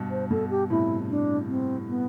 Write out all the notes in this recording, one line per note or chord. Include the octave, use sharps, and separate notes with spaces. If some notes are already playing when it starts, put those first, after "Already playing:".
Already playing: G2 B2
C5
G2 B2 A4
G4
A2 C3 E4
D4
C4
B3